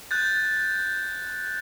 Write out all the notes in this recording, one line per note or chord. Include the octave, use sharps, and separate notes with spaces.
F#6 G6 A6